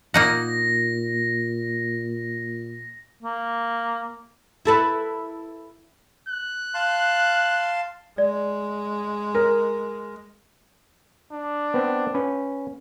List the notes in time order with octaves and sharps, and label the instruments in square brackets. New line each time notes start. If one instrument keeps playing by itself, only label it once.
[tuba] A#2 [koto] A#3 D#4 F#5 [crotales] A#6
[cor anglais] A#3
[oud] E4 A4 B4
[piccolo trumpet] F#6
[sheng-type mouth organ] F5 A5 C6
[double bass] G#3 [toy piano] D5
[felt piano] A#4
[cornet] D4
[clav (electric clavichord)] B3 C4
C#4 B4